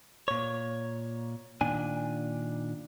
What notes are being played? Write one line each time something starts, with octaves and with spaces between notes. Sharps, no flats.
A#2 C#5
A#2 D#3 D4 G#5